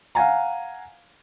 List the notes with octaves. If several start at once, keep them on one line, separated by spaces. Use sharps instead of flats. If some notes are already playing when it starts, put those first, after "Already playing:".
F5 F#5 G#5 A#5